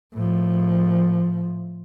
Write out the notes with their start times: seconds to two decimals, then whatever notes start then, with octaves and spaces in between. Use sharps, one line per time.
0.14 A2 F3